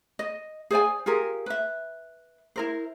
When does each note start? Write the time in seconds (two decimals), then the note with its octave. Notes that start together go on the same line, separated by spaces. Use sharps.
0.19 D#5
0.71 G#4 C5 D5 G#5
1.06 F4 G4 G#4 A#4
1.46 B4 E5
2.56 E4 A#4 C5